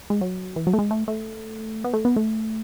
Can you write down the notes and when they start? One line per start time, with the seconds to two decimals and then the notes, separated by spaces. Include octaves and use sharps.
0.10 G#3
0.21 F#3
0.56 E3
0.67 F#3
0.73 A3
0.79 G#3
0.91 A3
1.08 A3
1.84 B3
1.93 A3
2.05 B3
2.16 A3